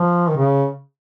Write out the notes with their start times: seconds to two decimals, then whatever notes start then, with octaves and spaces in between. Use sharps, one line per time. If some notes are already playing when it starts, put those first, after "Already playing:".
Already playing: F3
0.29 D#3
0.36 C#3